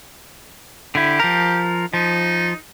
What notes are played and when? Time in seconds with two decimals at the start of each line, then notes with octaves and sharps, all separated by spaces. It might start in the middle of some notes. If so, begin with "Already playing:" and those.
0.95 D3 E4 G4
1.20 F3 A#4
1.94 F3 D#4